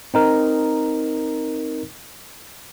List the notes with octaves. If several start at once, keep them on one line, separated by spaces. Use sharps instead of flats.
C4 D#4 A#4